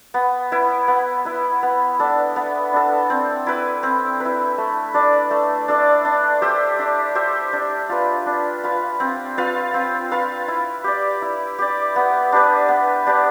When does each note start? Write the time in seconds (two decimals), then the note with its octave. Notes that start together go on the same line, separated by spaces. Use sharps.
0.14 B3
0.52 E4 B4
0.88 B3
1.25 E4 B4
1.63 B3
1.99 D4 A4
2.36 B3
2.73 D4 A4
3.10 C4
3.46 E4 B4
3.83 C4
4.20 B4
4.25 E4
4.58 A3
4.94 D4 A4 D5
5.31 A3
5.68 D4 A4 D5
6.05 D4
6.42 G4 C5 E5
6.79 D4
7.15 G4 C5 E5
7.53 D4
7.89 F4 B4
8.26 D4
8.64 F4 B4
9.00 C4
9.38 F4 B4 F5
9.74 C4
10.11 F4 B4 F5
10.48 E4
10.84 G4 D5
11.22 E4
11.58 G4 D5
11.96 B3
12.32 D4 G4 B4
12.69 B3
13.06 D4 G4 B4